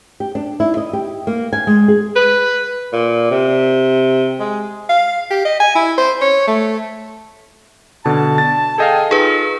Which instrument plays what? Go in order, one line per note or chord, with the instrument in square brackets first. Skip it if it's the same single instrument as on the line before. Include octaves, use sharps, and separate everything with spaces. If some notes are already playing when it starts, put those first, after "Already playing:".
[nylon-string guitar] G4
D4
E4
D#5
G4
A#3
G#5
G#3
G#4
[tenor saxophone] B4
A#2
C3
G#3
[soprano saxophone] F5
G4
D#5
G#5
E4
C5
C#5
A3
[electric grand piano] B2 D3 [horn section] A5
[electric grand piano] A6
[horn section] G#4 G5 [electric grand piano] A4 D#5 F5
[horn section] D#4 F4 [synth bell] G#4 B4